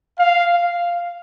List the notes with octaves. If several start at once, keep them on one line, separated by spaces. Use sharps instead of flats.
F5